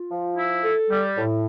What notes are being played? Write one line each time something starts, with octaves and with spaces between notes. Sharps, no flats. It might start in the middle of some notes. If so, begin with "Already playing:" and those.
Already playing: F4
F3
E4
A4
G3
A2